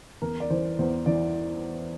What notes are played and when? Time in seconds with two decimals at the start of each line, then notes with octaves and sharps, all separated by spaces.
0.22 E2 A#4
0.40 D5
0.50 E3 C5
0.79 E2 C5
1.06 E3 D5